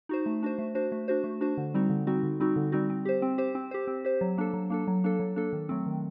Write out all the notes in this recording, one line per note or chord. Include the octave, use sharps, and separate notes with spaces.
D#4 F#4 C5
A3
D4 F#4 C5
A3
D4 F#4 C5
A3
D4 F#4 C5
A3
D4 F#4 C5
D3
G3 C4 D#4 F#4
D3
G3 C4 D#4 F#4
D3
G3 C4 D#4 F#4
D3
G3 C4 D#4 F#4
C4
G4 C5
C4
G4 C5
C4
G4 C5
C4
G4 C5
F#3
A#3 D4 A4
F#3
A#3 D4 A4
F#3
A#3 D4 A4
F#3
A#3 D4 A4
D#3
F#3 A3 C4
D#3